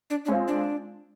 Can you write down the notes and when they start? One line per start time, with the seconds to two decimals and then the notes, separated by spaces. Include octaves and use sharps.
0.10 D4
0.25 D4
0.28 G#3 C4 C#4 F4
0.48 D4